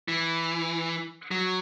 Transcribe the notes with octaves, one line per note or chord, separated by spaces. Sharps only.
E3
F#3